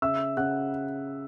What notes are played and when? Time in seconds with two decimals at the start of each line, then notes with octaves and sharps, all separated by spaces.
0.02 C#3 E5 E6
0.37 C#3 F#5 F#6